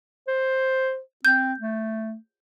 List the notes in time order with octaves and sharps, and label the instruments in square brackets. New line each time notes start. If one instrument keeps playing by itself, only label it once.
[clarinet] C5
[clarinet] C4 [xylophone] G6
[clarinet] A3